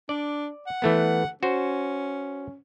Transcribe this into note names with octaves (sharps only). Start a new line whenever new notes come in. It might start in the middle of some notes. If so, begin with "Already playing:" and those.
D4 D5
F#5
E3 A3 B3
C#4 F#4 C5